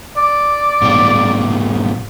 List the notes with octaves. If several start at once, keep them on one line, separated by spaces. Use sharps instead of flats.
D5
G#2 B2 G3